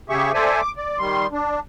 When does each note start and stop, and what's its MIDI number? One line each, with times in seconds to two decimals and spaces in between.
0.10 0.32 49
0.10 0.32 67
0.10 0.32 68
0.10 0.32 76
0.10 0.32 85
0.34 0.61 69
0.34 0.61 72
0.34 0.61 74
0.34 0.61 76
0.34 0.61 80
0.62 0.71 86
0.77 0.98 74
0.99 1.27 51
0.99 1.27 55
0.99 1.27 84
1.32 1.60 62